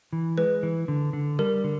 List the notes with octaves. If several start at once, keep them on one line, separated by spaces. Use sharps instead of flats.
E3
G#3 B4
E3
D3
D3
G3 A#4
D3